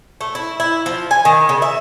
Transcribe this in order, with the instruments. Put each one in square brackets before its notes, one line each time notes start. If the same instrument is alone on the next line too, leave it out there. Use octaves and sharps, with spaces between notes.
[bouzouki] A3
E4
E4
F3
G#5
D#3
C#3
E5